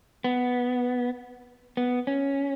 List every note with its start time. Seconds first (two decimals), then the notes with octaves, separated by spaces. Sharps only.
0.24 B3
1.77 B3
2.07 C#4